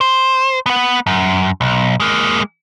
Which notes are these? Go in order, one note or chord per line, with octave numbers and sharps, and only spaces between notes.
C5
B3 F#5
F#2
B1
G#3 A#3